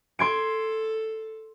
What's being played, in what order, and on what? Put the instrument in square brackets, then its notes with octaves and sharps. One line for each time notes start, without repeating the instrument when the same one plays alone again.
[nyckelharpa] A4 [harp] C6 G#6 D7